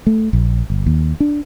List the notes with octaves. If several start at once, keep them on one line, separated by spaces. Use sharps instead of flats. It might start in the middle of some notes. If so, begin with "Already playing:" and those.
A3
A#1
G1
D#2
D4